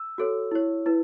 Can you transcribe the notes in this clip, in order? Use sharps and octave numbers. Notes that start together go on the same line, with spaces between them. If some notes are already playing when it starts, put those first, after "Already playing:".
Already playing: E6
F#4 A4 C#5
E4 C#5
E4 B4